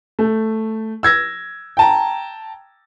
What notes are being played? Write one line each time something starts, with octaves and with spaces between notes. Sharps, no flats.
A3
E6 G#6 A#6
G5 A5 A#5